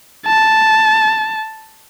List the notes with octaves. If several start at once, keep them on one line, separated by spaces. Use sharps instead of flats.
A5